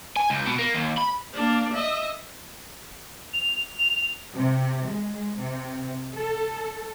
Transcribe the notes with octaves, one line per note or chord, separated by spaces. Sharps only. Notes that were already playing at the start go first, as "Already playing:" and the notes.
G#5
C#2
B2
A#3
D#2
B5
A#3 D4
D#5 E5
F7
C3
G#3
C3
A4